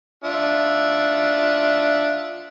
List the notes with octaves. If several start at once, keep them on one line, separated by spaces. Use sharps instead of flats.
D4 F4 E5